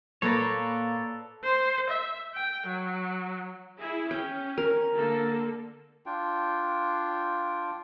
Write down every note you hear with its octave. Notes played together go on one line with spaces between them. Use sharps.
A#2 A#3 F4 A4 B4 C#5 D5 A#5
C5
E5
G5
F#3
E4 G#4
C#4 G5
A#4
D3 A#3 A4
D4 F4 G5